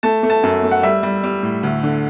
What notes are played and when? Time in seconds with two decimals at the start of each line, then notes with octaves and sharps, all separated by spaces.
0.03 A3 A5
0.23 A3
0.30 A5
0.43 F#2
0.63 A3
0.71 F#5
0.83 G3 E5
1.03 G3
1.24 G3
1.43 A2
1.63 D2
1.83 D3